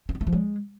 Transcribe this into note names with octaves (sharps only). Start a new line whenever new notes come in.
C#4
B3
A3
F3
G#3